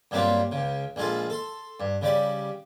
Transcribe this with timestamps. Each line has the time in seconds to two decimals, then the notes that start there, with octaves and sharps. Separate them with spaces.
0.11 G2 F#3 G3 A#3 C4 F4
0.51 C#2 C#3
0.96 A#1 G#3 F4 A4
1.30 A4 C6
1.80 G2
2.01 C#3 G3 D5 B5